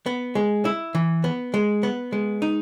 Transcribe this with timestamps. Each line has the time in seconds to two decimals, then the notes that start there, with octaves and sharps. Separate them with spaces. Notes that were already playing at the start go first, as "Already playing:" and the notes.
0.06 B3
0.35 G#3
0.65 E4
0.95 E3
1.24 B3
1.54 G#3
1.83 B3
2.12 G#3
2.42 D#4